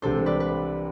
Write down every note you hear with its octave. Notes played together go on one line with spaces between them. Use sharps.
C2 C3 E3 G#3 D4 A4 C5
B4 D5
B4